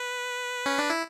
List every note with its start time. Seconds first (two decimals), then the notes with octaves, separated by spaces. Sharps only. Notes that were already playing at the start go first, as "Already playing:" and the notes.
Already playing: B4
0.66 C#4
0.78 D4
0.90 E4